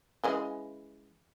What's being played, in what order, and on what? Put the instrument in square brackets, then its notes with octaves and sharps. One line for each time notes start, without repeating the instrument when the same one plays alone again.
[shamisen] C#3 E3 G#3